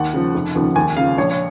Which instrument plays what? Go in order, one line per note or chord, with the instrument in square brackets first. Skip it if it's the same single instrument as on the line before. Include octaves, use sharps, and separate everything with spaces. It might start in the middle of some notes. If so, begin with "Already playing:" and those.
Already playing: [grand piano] D#2 F#5
C#3 F3
F1
D#2 C#3 F3
D#2 G#5
C#3 F3 F5
A#1 C#5
C#5